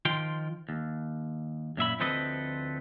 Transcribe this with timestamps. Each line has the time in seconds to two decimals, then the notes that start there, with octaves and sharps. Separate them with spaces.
0.05 D#3 F3 F4 G5 C6
0.69 D#2
1.77 F#2 A#2 E5 B5
2.00 D2 F3 C4 A4 B4 D#5